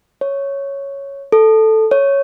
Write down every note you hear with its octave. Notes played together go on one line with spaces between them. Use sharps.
C#5
A4
C#5